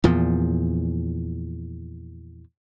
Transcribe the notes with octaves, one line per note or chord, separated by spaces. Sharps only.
E2 A#2 F3